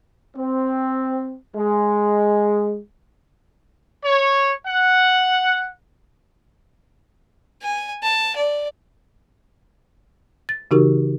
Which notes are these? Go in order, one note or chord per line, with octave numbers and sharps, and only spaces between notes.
C4
G#3
C#5
F#5
G#5
A5
D5
A6
C#3 E3 D#4 F#4 G4 A#4